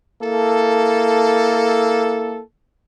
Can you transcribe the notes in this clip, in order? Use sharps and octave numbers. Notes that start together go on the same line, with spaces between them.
A#3 E4 A4